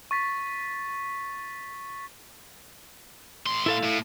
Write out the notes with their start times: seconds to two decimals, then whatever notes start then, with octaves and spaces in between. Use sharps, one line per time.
0.11 C#6 A6 B6
3.46 A2 C6
3.66 E4 A4 F5
3.84 A2